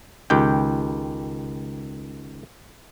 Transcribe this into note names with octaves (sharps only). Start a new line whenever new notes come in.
C#2 D#3 G4 G5